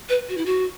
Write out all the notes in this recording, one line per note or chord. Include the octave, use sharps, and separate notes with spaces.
B4
F#4
E4
F#4